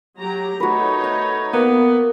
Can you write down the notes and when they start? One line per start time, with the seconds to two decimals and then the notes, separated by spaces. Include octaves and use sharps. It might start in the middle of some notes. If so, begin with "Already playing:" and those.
0.21 F#3 G4 A#5
0.60 A3 D#4 F#4 B4 C#5
1.04 F#5
1.53 A#3 B3